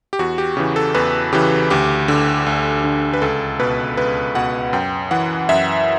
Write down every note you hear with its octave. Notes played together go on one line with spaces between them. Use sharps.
G4
E2 F#4
G4
C#3 E3 G4
A4
E2 B4
C#3 E3 G4
D2 G4
D3
D2
D3
B4
C#2 A4
B2 B4
C#2 B4
B2 F#5
F#2 G5
E3 F#5
F#2 E5